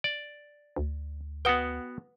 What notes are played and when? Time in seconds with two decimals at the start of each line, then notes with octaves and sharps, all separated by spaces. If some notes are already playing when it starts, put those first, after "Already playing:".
0.04 D5
0.76 D2
1.45 B3 F#4 B4 F#5 G5 D#6